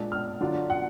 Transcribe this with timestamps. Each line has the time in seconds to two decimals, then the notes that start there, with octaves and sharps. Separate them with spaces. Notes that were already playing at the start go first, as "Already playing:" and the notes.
Already playing: A#2 G#3 D4
0.12 F6
0.41 D3 F#3 D4 F4
0.70 F#5